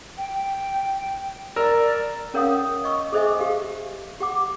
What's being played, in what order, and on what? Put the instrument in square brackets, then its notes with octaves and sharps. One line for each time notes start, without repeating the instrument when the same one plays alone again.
[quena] G5
[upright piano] A#4 E6 [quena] D5
[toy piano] C#4 A#4 C#5 F5 F#5 D#6
D#5 C#6 E6
G#4 A4 C5 D#5 E5 G#5
G4 F5
G4 F#5 D6